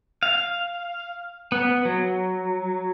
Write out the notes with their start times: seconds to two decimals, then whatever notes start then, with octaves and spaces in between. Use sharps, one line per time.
0.23 F5
1.52 B3
1.85 F#3